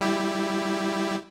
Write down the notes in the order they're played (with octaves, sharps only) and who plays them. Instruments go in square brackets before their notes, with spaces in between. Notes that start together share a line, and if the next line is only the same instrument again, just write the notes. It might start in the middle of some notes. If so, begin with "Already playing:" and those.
[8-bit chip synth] G3 E4 G4